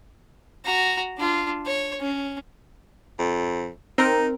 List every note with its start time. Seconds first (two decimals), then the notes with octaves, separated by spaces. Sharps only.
0.65 F#4 A#5
1.18 D4 F4
1.66 C#5
2.00 C#4
3.19 F2
3.98 C4 D#4 A#4